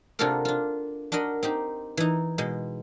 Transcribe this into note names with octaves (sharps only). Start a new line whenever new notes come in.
C3 D4 F4 F#4 A4 A#4
D4 F4
D4 F#4 A#4 D#5 B5
C4 D#4 G4
E3 D#4
B2 G#3